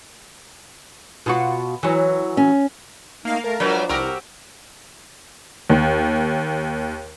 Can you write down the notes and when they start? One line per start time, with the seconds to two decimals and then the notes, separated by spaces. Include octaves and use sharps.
1.26 B2 F4 F#4
1.83 E3 F#3
2.37 C#4
3.25 A3 A#3 D#4 F5
3.44 A3 A#4 F5 A5
3.60 F3 F#3 G#3 D4 B4
3.89 C2 C4 F#4 G4 A#4
5.70 D#2